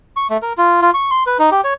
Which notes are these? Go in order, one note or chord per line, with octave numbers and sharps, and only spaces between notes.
C#6
A3
A#4
F4
F4
C#6
C6
B4
D#4
G4
C#5